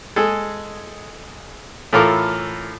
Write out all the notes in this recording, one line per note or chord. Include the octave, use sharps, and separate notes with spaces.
G#3 G#4 A4
A2 E3 F4 A4 A#4 D6